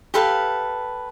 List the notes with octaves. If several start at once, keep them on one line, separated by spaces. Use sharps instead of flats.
G4 A4 B4 F5